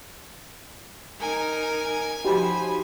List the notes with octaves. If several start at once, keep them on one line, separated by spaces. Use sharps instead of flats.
D#4 A#4 G#5
F3 D#4 F#4 G4 C5 B5